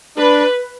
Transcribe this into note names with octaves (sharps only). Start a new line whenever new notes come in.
D4 B4